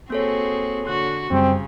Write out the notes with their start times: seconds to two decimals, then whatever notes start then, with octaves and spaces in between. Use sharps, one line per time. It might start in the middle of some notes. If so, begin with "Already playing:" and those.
0.10 A#3 C4 F#4 G#4 A4 C#5
0.85 D3 F#4 C6 F#6
1.31 F#2 C#3 G3 C4